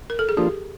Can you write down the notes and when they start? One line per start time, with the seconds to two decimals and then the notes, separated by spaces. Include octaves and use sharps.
0.10 A#4
0.19 A4
0.29 G#4
0.37 F3 A#3 D4 F4 G4